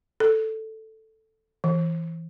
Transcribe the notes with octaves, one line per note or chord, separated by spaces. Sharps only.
A4
E3